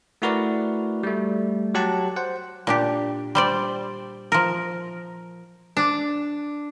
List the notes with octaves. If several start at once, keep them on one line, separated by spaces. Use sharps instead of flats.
A3 E4 F#4 A#4 B4 D5
G3 A3
F#3 G4 F#5 A5
C5 F#5
A#2 D4 G4
G3 C5 D5
F3 A#4
D4